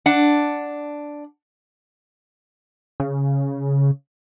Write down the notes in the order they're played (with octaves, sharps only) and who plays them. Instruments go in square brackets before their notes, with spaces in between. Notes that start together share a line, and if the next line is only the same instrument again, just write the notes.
[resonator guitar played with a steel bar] D4 F#5
[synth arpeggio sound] C#3